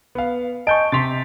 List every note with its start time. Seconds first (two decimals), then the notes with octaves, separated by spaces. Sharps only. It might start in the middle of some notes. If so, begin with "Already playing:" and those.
0.15 B3 F5
0.67 D#5 G#5 A5 C#6 G6 D7
0.92 C3 C6 A6 B6 F7